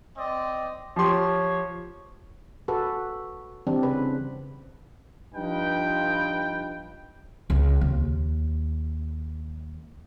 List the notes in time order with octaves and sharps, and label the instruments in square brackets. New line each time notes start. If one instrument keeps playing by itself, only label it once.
[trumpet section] C4 D5 D#5
[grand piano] F3 G4 C6 [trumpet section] C#5
[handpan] F#4 A4 B4
E3 G3 C4 D4
C#3 B4
[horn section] G2 F3 D#4 B4 G5
[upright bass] C#2
D#2